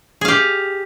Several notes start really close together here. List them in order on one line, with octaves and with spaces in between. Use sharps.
G#4 F5 G4